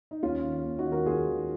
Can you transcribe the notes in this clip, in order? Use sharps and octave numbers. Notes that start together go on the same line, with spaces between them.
D#4
D#2 C#4 F4
D#3
D#2
D#4 F#4
D#3
F#4 A#4
D#2 F4 G#4
D#3